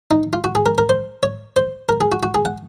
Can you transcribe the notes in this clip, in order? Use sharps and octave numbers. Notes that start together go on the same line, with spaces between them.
D#4
F4
F#4
G#4
A#4
A#4
C5
C#5
C5
A#4
G#4
F#4
F#4
G#4
F#5